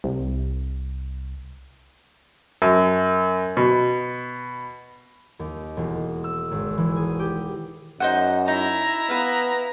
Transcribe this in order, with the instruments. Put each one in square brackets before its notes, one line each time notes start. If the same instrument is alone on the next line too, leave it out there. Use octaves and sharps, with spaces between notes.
[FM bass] C2
[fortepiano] F#2
B2
[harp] D#2
E1
E6
G#1
E3
G#4
G4
[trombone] F#2 [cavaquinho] D#4 C5 F#5
[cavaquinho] D#4 [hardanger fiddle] E4 A#5
[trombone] B3 [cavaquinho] B4 F5